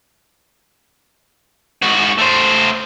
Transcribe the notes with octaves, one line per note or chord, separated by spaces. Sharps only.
G#2 F#4
A3 C5